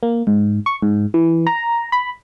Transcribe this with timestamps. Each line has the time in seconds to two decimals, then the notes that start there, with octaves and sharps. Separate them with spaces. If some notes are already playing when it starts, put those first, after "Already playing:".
0.03 A#3
0.27 G#2
0.66 C#6
0.82 G#2
1.14 E3
1.47 A#5
1.92 B5